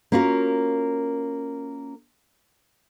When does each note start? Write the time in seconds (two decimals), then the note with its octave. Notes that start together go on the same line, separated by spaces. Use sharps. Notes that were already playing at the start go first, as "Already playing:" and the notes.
0.12 A#3 C#4 F4 F#4 A#4